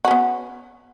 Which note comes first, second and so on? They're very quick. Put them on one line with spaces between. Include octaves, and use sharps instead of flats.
F#4 C#4 B3